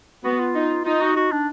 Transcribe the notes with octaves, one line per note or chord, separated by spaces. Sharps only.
B3 F#4
F4
D#4
D#4 F4
F#4
F#4
D4